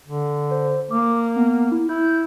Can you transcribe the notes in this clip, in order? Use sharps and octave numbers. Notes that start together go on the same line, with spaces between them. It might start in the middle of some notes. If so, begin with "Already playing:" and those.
D3
C5
A#3 D6
B3
E4
E4 G6